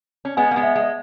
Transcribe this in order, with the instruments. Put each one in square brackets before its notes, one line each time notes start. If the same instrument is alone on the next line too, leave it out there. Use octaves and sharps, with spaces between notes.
[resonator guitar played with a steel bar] C#4
[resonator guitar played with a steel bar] G#3 B3 [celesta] G#5
[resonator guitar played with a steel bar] A#3
G#3 B3
[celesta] E5
[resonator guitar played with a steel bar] G#3